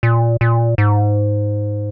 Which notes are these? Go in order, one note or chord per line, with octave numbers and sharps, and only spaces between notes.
A#2
A#2
G#2